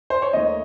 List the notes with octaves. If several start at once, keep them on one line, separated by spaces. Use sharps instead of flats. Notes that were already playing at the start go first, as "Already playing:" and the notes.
C5
C#5
D#2 D#3 A3 D#5